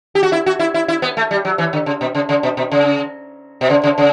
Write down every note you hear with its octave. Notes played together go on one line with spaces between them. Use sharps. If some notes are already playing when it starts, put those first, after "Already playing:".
G4
F#4
E4
F#4
E4
E4
E4
B3
A3
G3
F#3
E3
D3
C#3
B2
C#3
C#3
B2
B2
C#3
B2
C#3
C#3
C#3